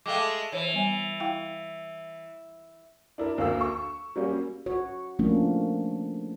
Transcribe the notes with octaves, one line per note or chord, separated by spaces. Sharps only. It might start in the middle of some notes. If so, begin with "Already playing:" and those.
G#3 A3 F5 G5 D6
E3 C5 C#5
G3 B3 G#5
E4 F5 G5
D4 E4 A#4
D2 A#3 F5 E6
C#6
F#3 G3 A#3 C#4
F#4 C#5
F3 A3 A#3 C#4 D4